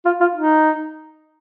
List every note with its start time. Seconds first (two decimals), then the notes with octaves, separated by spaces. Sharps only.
0.05 F4
0.20 F4
0.35 D#4